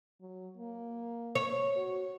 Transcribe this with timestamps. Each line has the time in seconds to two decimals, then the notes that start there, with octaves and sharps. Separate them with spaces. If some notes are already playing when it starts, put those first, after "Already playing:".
0.21 F#3
0.57 A#3
1.35 C#5
1.76 F#4